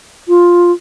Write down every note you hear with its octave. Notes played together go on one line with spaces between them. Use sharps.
F4